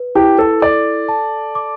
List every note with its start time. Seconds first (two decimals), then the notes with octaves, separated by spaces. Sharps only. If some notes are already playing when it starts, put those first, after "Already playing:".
Already playing: B4
0.15 E4 G4
0.39 A4
0.62 A4 D5
1.09 A5
1.55 D6